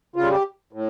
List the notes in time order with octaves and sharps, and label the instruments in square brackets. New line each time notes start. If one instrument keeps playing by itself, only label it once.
[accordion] C#3 G3 F4
G4
A2